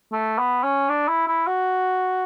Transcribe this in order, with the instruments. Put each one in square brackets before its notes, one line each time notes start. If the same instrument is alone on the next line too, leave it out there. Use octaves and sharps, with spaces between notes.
[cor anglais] A3
B3
C#4
D4
E4
E4
F#4